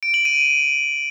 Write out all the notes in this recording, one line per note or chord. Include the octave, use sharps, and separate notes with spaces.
D7
F#7
D#7